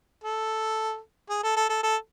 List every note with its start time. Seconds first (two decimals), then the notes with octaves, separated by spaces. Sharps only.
0.24 A4
1.30 G#4
1.43 A4
1.57 A4
1.70 A4
1.83 A4